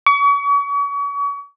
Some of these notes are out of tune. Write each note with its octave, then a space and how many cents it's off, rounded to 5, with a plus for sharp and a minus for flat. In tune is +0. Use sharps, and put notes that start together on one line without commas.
C#6 +40